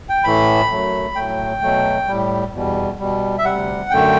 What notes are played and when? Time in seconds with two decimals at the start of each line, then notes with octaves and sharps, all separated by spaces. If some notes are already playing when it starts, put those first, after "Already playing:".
0.09 G5
0.24 A2 E3 A3 B5
0.71 F#2 F#3 A3
1.16 A2 F#3 A3 G5
1.62 B2 F#3 A3
2.08 A2 G3
2.53 E2 B2 G3
2.99 B2 G3
3.38 E5
3.44 D2 C3 G3 F#5
3.90 F#2 D3 A3 G5